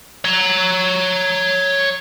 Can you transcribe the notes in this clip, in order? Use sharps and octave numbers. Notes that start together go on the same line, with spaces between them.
C#5 A#5